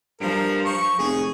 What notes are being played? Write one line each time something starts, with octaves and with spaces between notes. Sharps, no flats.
G2 F3 A#4
C#6
F1 G#4